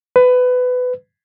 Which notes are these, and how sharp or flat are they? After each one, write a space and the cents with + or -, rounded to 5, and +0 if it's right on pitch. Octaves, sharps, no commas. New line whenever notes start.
B4 +20